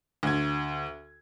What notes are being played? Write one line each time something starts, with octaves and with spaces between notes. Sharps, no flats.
D2 G#6